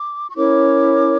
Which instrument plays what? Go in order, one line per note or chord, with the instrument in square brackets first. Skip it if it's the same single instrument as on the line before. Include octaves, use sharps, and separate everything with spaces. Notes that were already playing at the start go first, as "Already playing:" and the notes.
Already playing: [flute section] D6
C#6
C#4 E4 A#4 C#5 D6